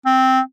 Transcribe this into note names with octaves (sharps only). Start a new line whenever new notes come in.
C4